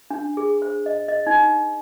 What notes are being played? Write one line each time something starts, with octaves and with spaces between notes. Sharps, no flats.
D4
G#4
C5
D#5
D#5
D#4